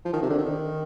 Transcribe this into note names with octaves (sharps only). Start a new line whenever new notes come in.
F3
D#3
C3
D3
D#3